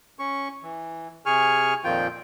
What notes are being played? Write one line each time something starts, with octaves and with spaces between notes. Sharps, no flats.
C#4 C#6
E3
C3 G#4 G#5 C#6 F6
F2 A#2 D#3 F3 F4 G5